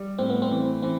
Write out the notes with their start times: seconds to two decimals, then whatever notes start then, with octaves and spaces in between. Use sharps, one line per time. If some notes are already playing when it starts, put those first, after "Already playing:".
Already playing: G3
0.18 A2 C4
0.30 B3
0.42 C4
0.51 E3
0.82 E3 C4